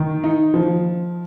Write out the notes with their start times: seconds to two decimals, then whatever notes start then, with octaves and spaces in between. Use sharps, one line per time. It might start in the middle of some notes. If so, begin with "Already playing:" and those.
Already playing: D#3
0.24 D#4
0.54 F3